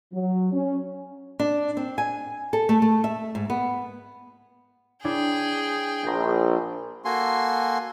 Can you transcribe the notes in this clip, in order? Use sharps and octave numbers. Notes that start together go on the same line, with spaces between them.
F#3
C#4
D4
C4
G#5
A4
A3
A3
E5
G#2
B3
D4 E4 G#4 C#5 G5
A#1 G5 A#5
A#3 F#4 A4 G#5 C6